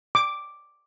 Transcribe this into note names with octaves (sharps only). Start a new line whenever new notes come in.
D6